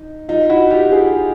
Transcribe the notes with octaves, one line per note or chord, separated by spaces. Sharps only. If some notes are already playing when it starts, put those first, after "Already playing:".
Already playing: D#4
D#4 F4
E4 F#4
F4 G4
F#4 G#4